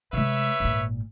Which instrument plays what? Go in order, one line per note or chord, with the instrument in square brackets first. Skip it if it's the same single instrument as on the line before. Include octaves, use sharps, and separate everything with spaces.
[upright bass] C3 G#3 [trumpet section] B4 C#5 E5
[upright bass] G#1 A#2